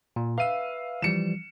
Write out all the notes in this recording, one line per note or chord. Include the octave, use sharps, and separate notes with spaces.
A#2
B4 E5 F5 E6 D#7
E3 F3 G3 C#7 E7